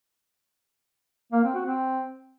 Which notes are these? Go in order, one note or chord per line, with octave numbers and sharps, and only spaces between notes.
A#3
C4
F#4
C4